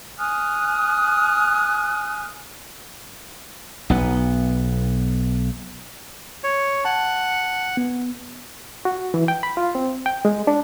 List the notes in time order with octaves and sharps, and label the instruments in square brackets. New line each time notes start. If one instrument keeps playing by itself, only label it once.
[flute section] G#5 D#6 F6 F#6
[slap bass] B1 B3
[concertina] C#5
[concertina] F#5 [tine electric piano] A5
[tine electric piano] B3
[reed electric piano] F#4
E3
G5
B5
F4
C4
G5
G#3
D4